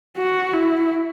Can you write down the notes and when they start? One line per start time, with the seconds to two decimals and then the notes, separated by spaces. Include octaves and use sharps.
0.18 F#4
0.54 E4